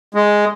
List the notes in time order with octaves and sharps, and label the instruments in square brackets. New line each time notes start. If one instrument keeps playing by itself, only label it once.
[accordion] G#3